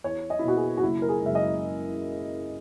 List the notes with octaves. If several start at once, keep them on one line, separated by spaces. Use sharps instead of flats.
E2 C#5
D#5
E4
B2 A#3 F#4
G#4
F#4
F#1 E4
A#4
G#4
F#2 C#3 G#3 E5
D#5